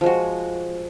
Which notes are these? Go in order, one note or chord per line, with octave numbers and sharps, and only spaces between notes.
F3 G#3 F#4